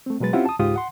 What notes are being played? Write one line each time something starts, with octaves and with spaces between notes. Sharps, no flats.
A3 C4
B2 F#3 G#3 B4 A6
C4 C#4 E4 F4 G4 F#5
A5 D#6
C#2 G#2 F4 G4 D#6
F#5 C6